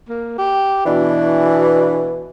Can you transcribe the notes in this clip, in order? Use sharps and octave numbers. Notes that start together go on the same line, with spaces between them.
A#3
G4
B2 E3 D4